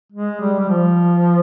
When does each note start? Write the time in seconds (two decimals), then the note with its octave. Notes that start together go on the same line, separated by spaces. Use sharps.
0.12 G#3
0.41 G3
0.59 G3
0.69 F3